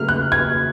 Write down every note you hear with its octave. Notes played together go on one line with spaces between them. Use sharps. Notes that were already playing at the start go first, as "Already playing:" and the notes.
Already playing: C#3 F#3 A3 F6
F#6
G#6